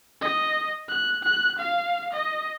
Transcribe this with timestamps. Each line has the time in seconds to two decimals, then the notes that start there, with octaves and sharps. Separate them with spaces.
0.21 D#5
0.89 F#6
1.23 F#6
1.59 F5
2.13 D#5